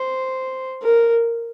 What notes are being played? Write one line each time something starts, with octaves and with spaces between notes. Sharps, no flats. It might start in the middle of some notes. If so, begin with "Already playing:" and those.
Already playing: C5
A#4